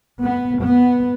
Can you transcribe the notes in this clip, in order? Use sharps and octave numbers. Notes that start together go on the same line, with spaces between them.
B3
B3